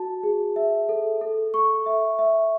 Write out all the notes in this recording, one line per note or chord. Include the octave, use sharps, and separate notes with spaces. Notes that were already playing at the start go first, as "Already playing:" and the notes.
Already playing: F#4 A5
G#4
E5
A4
A4
C#6
E5
E5